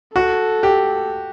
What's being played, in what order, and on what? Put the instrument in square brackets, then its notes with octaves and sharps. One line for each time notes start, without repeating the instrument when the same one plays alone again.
[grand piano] F#4 [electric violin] A4
[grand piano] G4